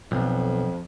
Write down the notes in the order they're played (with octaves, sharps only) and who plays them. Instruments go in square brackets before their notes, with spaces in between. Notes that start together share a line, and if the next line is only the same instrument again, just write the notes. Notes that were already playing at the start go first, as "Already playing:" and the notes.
[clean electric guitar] B1 [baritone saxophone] F2